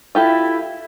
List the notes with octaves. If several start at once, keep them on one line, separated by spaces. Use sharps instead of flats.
E4 F4 G4 A4